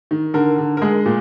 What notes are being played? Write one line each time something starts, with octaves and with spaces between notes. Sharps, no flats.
D#3
D3 A#4
D3
A#4
G#3 G#4
A#2